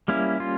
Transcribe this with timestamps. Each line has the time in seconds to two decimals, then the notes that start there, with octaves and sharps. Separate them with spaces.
0.08 G3 A#3 C#4 E4
0.40 F4